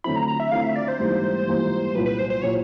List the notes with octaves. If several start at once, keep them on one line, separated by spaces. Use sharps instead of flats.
D3 F#3 A3 C4 E4 B5
A#5
A#5
E5
D3 F#3 A3 C4 E4 F5
E5
D5
C5
G#2 E3 G3 A#3
G#2 E3 G3 A#3
C2 A#2 F#3 B4
B4
C5
C5
A#2 F#3 C#5